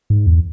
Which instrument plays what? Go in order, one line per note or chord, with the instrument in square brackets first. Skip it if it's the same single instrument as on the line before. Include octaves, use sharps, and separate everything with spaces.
[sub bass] G#2
E2